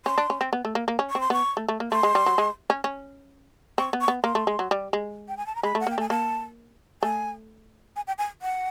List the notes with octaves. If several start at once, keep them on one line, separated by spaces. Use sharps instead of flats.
C#4 C6
D4
C#4
C4
B3
A3
A#3
A#3
C#4
C#6
C4
C6
B3 C#6
A3
A3
A#3
A3 C6
G#3
G3
F#3
G#3
C#4
C#4
C4 C#6
B3
C#6
B3
A#3 C6
A3
G#3
F#3
G3
G#3
G5
G#5
A5
A#5
G#3 B5
A3
F#5
A#3
G5
A3 G#5
A#3 A5
A3 G#5
G#5
G5
G#5
F#5